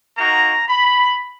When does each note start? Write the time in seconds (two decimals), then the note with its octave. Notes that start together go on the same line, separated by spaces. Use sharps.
0.17 A#3 D#4 F#4 A#5
0.69 B5